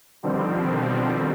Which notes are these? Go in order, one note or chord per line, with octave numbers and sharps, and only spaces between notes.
B2 D3 D#3 F3 G3 C4